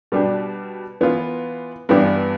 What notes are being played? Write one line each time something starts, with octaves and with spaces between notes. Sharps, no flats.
B2 G3 D4 G4
E3 B3 F4
G2 E3 B3 D4 G4